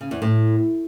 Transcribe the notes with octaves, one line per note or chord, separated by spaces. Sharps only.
C#3
E2
A2